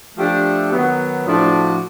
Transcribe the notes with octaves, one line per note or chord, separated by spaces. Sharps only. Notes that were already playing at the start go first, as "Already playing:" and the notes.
F3 A3 D4 G4
D#3 F#3 B3
A2 F3 A3 D4 F#4